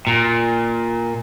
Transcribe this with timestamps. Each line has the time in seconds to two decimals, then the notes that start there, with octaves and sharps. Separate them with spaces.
0.07 A#2